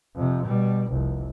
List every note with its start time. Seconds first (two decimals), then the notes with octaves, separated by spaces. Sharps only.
0.16 F2 C3
0.47 B2 G3
0.91 F1 C2